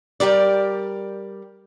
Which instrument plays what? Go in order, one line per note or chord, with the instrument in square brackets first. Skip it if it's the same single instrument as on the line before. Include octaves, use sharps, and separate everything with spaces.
[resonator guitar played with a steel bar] G3 G4 A#4 D5